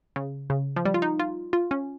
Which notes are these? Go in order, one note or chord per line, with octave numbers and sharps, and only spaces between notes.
C#3
C#3
F3
G3
F4
D#4
F4
F4
C#4